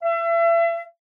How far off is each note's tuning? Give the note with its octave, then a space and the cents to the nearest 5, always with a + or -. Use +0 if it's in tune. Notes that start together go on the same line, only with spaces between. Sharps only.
E5 +35